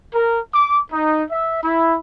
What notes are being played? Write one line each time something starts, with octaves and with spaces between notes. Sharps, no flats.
A#4
D6
D#4
E5
E4